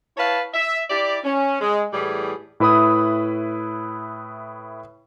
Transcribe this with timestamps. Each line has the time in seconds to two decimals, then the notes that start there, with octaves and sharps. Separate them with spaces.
0.18 E4 B4 C#5 F5 A5
0.54 E5
0.90 E4 G4 D5
1.24 C#4
1.61 G#3
1.94 A2 E3 G3 G#4
2.60 A2 E4 B4 B5 D#6